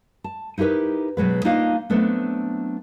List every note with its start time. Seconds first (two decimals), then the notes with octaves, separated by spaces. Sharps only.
0.24 A5
0.58 D#4 E4 G4 A#4 B4
1.17 B2 F#3 G#3 B4
1.45 A#3 D4 D#4 F4 D#5 F5
1.90 F#3 A3 B3 C4 D4